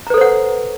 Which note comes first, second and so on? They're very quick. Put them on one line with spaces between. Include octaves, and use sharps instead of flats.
A#5 B4 A4 C5 F#5